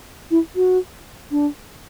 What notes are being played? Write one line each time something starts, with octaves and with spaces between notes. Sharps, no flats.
E4
F#4
D4